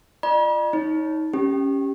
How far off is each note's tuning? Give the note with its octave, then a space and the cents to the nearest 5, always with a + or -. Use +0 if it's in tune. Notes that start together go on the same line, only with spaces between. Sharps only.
F4 -25 D5 +45 B5 -45
D#4 +25 C#5 +0
C#4 +0 G4 +0